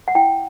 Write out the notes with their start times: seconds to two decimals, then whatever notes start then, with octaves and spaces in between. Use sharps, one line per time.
0.08 F#5
0.15 E4 G5